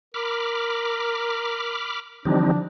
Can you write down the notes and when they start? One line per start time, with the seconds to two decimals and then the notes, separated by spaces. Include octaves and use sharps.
0.14 A#4 B5 D6 F6
2.25 D3 E3 F3 G3 C4 D4 D#4